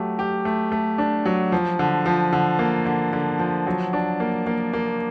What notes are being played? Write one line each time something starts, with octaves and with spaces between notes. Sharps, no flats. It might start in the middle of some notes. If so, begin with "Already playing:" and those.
Already playing: F#3 A3 G4
G4
A3
A3
D4
F#3
F3
D3
F3
D3
A#3
D3
D3
F3
F#3
D4
A#3
A#3
A#3